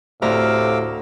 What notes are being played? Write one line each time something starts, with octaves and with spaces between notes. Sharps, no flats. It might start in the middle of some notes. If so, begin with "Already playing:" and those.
D2 A2 C3 F5 A#5 D6 E6 F6